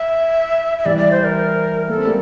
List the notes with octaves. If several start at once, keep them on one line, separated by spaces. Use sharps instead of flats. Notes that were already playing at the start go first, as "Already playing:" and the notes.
Already playing: E5
E5
E3 G3 D5
D5
C5
A#4
A#3 A4
C4
G3 A#3